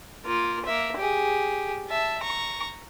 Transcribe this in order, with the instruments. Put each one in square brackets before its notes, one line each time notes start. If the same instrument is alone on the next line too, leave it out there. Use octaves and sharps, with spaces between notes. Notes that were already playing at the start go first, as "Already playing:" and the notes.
[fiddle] A#3 F4
A#3 E5
G4 G#4
E5 A5
A#5 C#6